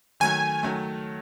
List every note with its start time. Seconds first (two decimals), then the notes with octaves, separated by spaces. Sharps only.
0.20 D#3 F#3 A3 G#5
0.63 D#3 F#3 A3